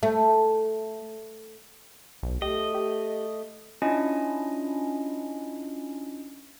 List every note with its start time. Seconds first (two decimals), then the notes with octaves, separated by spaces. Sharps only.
0.03 A3
2.23 B1
2.42 A3 G4 D#5
2.74 G4
3.82 C#4 D4 E4 F4 D#5 G#5